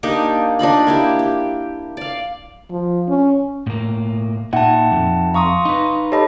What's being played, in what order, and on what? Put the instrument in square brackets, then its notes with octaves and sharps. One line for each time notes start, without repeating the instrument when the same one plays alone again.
[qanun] A#3 D4 D#4 G4
D4 D#4 F4 B5
A#3 E4 G4
G4
D5 F5
[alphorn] F3
C#4
[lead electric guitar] A2 A#3
[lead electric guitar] A#2 [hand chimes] D#4 E5 G5 [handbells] F#5 A5
[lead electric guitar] F2
[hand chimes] F5 C6 [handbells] A#5 C#6 D#6
[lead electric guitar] D#4 B4
[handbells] G4 A4 D#5 [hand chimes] C#5 A5 B5